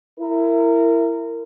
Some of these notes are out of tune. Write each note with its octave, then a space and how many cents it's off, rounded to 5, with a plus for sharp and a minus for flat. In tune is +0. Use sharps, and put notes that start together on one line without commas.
E4 +15 A#4 -20